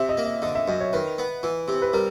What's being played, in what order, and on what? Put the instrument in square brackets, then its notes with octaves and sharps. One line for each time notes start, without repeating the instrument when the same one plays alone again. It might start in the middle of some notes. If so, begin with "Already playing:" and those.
Already playing: [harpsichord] C3 [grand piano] E5
[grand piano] D#5
[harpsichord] A#3
[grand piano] D#5
[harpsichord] D3 [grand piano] D#5
[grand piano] E5
[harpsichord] F#2 [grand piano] D#5
[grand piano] C#5
[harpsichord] D#3 [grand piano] B4
[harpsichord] B3
E3
C3
[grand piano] B4
[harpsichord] G3 [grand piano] A#4